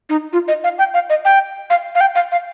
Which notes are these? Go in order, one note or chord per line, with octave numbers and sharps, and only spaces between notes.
D#4
F4
D#5
F5
G5
F5
D#5
G5
F5
F5
G5
F5
F5